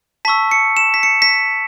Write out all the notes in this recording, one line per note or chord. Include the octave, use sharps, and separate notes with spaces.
A5 C#6 E6 B6
C#7
E7
B6
C#7
B6